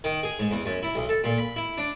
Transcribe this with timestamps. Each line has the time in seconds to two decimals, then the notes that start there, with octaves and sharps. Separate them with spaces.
0.04 D#3
0.23 G#4
0.39 G#2
0.51 E2
0.66 F#2
0.83 E4
0.95 B1
1.09 A4
1.24 A#2
1.38 B5
1.56 E4
1.78 D4